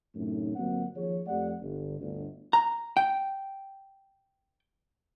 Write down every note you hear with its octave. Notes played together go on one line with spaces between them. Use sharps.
F#2 A2 C3 A3 D#4
G1 F#3 A#3 C4 F#4 F#5
D#2 F3 G#4 C#5
F2 A3 G4 D5 F#5
G1
G1 D2 D4
A#5
G5